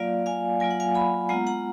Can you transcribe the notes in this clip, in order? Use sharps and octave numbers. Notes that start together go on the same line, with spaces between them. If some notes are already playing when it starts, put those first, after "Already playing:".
Already playing: F#3 A#3 F4 D5 F5
F5 G#5
F#3 A#3 F4 G#5
F#5
F5 G#5
G#5 B5
G#3 B3 F4 F#5 A#5
F#5 A#5